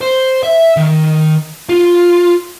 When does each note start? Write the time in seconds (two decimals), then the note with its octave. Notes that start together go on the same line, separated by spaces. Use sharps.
0.01 C5
0.43 E5
0.77 D#3
1.69 F4